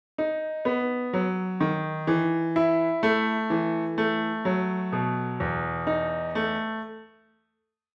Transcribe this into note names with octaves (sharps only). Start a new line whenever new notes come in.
D#4
B3
F#3
D#3
E3
E4
A3
E3
A3
F#3
B2
E2
D#4
A3